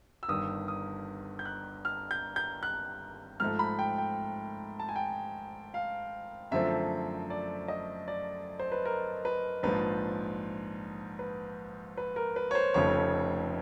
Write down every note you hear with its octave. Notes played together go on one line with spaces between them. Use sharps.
E6
G1 G2 D#3 D#6
D#6
G6
F#6
F6
G6
G6
F#6
G#2 F3 A3 F6
B5
G5
G5
A5
G#5
G5
F5
F#2 D3 F3 A3 C4 E5
D5
D#5
D5
C5
B4
A#4
B4
A#1 G#2 F3 B4
B4
B4
A#4
B4
C#5
C5
F1 F2 C#3 F3 A3 C#5